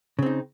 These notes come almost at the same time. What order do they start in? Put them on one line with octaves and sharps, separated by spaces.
C#3 C4 D#4